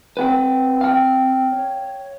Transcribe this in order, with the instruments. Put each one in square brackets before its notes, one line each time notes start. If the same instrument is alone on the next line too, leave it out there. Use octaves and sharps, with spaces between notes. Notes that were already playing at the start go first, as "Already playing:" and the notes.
[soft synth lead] C4 [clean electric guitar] B4 F#5 G5
[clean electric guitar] F5 G5
[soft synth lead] C#5